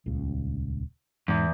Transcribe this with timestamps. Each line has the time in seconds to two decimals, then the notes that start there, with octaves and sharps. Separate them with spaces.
0.06 D#1 C#2 C#3
1.28 E2 G#2